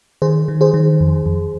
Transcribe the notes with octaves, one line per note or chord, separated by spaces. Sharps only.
D#3 G#4 C5
D#3
G#4 C5
D#3
F2
F2